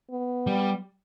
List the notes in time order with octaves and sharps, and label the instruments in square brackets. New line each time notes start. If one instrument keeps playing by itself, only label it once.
[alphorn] B3
[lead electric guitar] G3